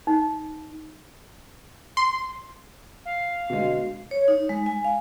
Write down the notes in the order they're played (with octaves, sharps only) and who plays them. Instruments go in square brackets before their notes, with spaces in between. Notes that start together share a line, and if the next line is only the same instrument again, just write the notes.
[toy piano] D#4
[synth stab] C6
[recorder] F5
[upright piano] B2 D3 G#3
[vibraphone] C#5
D#4
G#3
G#5
F5